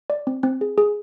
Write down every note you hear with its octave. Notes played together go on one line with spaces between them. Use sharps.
D5
C4
C4
G#4
G#4